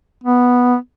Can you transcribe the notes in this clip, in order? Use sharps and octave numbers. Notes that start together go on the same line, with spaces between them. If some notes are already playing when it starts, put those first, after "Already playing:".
B3